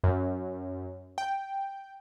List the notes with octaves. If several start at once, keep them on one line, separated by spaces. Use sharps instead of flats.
F#2
G5